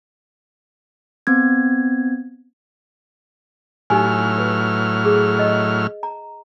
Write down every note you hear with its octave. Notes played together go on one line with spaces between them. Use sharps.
B3 C4 G#6
A2 F#3 D#4 G4 G#5 F6
B4
G#4
D#5
A#5